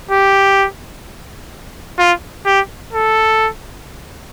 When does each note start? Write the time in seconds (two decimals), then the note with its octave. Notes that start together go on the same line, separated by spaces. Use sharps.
0.11 G4
1.98 F4
2.46 G4
2.93 A4